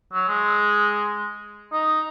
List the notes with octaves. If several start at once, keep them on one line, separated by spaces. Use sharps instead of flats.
F#3
G#3
D#4